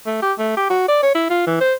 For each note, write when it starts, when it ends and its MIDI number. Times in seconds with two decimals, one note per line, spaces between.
0.06 0.19 57
0.22 0.33 67
0.38 0.56 57
0.57 0.65 67
0.70 0.84 66
0.88 1.01 74
1.02 1.11 73
1.15 1.30 64
1.30 1.44 65
1.47 1.60 52
1.61 1.74 72